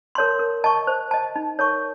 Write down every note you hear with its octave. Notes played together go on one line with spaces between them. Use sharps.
A#4 C#5 A5 C6
A#4
D#5 A5 C#6
C5
D#5 A5
D#4
A#4 C#5 A5 C#6